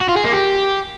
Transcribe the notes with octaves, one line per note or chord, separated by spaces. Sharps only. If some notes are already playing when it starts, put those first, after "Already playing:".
F#4
F4
G#4
A#3
G4